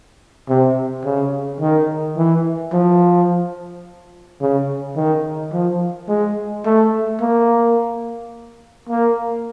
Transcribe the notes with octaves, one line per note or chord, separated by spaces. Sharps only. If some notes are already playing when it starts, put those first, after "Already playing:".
C3
C#3
D#3
E3
F3
C#3
D#3
F3
G#3
A3
A#3
A#3